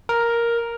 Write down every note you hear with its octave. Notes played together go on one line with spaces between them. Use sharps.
A#4